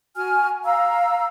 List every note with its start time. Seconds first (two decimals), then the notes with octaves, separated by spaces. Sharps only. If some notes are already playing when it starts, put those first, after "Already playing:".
0.16 F#4 G#5 F6
0.64 F5 A#5 E6